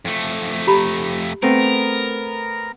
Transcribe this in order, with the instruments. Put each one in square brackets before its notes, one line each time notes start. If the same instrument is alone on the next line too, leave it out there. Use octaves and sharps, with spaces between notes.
[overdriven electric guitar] F2 A3
[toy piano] G4 A#5 B5
[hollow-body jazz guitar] A3 B3 C4 [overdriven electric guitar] A#4